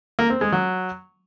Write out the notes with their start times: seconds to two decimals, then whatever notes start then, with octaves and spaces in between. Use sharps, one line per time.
0.19 A#3
0.30 C4
0.41 G#3
0.52 F#3